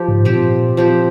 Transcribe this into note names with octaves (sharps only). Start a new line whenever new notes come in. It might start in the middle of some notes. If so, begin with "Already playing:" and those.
Already playing: F3 G4
G#2
A#2 F3 C4 G4
F3 C4 G4